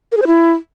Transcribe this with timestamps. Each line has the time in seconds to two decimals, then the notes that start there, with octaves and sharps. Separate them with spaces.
0.12 A#4
0.17 G#4
0.22 C5
0.27 E4